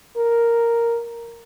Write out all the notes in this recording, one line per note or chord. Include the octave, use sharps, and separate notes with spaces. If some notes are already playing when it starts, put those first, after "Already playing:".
A#4